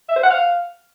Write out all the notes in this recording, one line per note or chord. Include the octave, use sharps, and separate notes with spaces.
E5
C5
F#5
F5